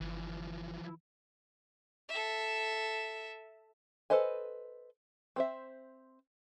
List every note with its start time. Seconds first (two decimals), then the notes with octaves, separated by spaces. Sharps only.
0.01 G1 E3 F3
0.85 E4
2.09 A4 E5
4.10 A4 B4 C5 D#5 G#5
5.36 C4 C5 E5